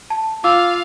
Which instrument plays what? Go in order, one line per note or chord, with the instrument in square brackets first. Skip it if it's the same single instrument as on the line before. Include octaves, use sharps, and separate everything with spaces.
[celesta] A5
[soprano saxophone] F4 [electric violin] F5 [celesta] D6 E6